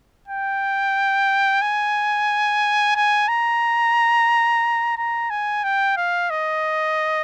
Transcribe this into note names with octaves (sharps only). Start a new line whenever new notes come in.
G5
G#5
G#5
A#5
A#5
G#5
G5
F5
D#5